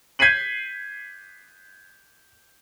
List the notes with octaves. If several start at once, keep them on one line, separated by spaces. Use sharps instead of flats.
G6 G#6 B6 C7 D#7 F#7